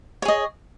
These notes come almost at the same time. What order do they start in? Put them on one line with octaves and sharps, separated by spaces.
C#5 G#4 D#5